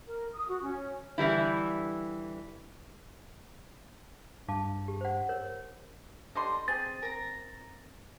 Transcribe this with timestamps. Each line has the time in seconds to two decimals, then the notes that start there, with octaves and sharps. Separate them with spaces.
0.07 A#4
0.34 D#6
0.48 F#4
0.63 C#4
1.18 D3 E3 G3 E4
4.48 G2 F5 A5 D6
4.88 G4
5.01 C5 F#5
5.29 A#4 C#5
6.35 D3 G3 D#5 C6
6.68 C4 G#4 A6
7.03 A#4 A#5